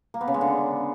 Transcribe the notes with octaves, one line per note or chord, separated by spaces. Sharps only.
A#3
B3
C#3
G#3
D3